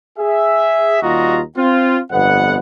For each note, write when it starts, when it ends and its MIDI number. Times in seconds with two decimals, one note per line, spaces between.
0.18 1.00 68
0.18 1.00 76
1.02 1.40 39
1.02 1.40 55
1.02 1.40 65
1.02 1.40 66
1.02 1.40 75
1.02 1.40 82
1.56 1.99 60
1.56 1.99 65
2.11 2.58 31
2.11 2.58 41
2.11 2.58 59
2.11 2.58 78